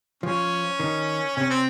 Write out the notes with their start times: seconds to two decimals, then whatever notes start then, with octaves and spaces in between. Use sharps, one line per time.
0.23 F3 C#4
0.80 D#3
1.37 C3 C#4
1.50 C4